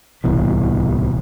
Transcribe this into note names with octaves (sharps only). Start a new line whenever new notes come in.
D1 C2 B2 E3